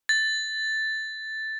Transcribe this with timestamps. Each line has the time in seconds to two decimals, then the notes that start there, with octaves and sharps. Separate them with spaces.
0.09 A6